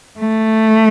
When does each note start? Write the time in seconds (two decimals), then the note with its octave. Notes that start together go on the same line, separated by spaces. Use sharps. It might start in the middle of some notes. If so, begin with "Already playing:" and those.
0.20 A3